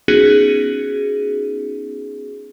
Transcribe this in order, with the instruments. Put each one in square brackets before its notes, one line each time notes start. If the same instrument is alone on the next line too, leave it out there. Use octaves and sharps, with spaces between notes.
[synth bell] B3 C#4 D#4 F#4 G#4